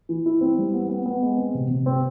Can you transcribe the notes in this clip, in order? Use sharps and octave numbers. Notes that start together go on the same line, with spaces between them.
E3
E4
C4
G3
B3
B3
B3
G#3
C4
C3
C3
C4